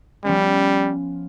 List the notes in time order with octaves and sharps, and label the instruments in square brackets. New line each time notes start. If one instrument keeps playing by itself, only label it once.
[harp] F3 B3 C#4 [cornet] G3